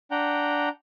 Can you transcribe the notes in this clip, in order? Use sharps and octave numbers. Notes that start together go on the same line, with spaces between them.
D4 F#5 G5 A#5